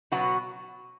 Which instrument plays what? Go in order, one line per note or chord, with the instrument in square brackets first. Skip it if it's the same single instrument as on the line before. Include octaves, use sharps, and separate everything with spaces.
[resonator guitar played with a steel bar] B2 F#3 B3 F#4